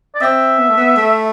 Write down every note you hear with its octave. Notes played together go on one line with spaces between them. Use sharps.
D5
C4 E5
B3
A3
B3
A3